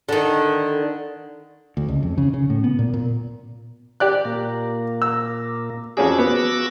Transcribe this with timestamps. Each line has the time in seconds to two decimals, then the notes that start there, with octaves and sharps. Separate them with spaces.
0.09 D3 D#3
1.77 D2
1.88 C#2
2.03 F2
2.18 C#3
2.34 C#3
2.50 A2
2.64 B3
2.79 A#2
2.94 A#2
4.00 G4 D5 F#6
4.25 A#2 A#3
5.02 E6
5.97 F2 C#4 F#4 G#4 D6 E6
6.19 B3